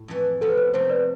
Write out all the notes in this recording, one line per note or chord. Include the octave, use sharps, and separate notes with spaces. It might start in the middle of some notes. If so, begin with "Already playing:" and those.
Already playing: A2
F2 E3 A3
C3 F3 B3 A4
B4
C3 F3 A3 C4 C5
B4 D5